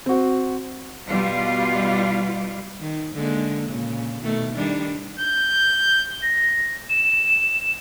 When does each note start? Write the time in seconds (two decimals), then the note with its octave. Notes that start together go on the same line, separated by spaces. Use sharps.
0.06 C4 F#4
1.08 B2 G3 F4
2.80 D#3
3.14 D3 G#3 A#3
3.69 A#2 C#3
4.21 B2 D#3 A3
4.54 D#3 G3 D4
5.20 G6
6.22 A#6
6.89 E7